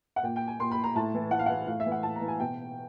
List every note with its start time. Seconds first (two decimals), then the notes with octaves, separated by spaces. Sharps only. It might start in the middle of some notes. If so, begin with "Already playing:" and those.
0.16 F#5
0.23 A#2 G5
0.36 G5
0.47 G#5
0.59 A#2 C6
0.71 B5
0.84 A#5
0.95 A2 A5
1.14 E3
1.31 A2 F#5
1.39 F5
1.46 E3 F#5
1.67 A2 F5
1.80 E5
1.86 E3
1.92 F#5
2.03 A2 A5
2.15 A#5
2.21 E3
2.28 G#5
2.40 B2 G5